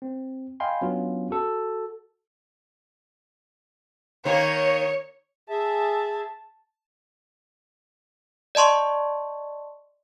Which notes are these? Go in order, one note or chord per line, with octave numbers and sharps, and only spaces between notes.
C4
D#5 F5 G5 G#5 B5 C6
F#3 B3 C#4 D4 F4
F#4 A4
D#3 A#3 C#5
G#4 E5 A5
D5 D#5 A5 C6 C#6